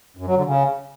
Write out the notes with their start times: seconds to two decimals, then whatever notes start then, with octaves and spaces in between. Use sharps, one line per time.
0.17 F#2
0.26 F#3
0.36 D3
0.46 C#3